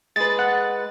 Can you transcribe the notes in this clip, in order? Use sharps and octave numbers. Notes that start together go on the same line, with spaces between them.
G#3 B4 A6
F#5